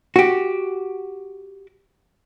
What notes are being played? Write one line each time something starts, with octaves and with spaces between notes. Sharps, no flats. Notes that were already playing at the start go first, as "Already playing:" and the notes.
F#4 G4